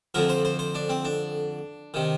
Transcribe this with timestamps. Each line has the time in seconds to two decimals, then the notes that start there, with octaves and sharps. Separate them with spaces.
0.14 F2 D3 F3 A#4
0.29 C5
0.45 C5
0.59 C5
0.75 D4
0.89 C4
1.05 D4
1.94 C3 D#3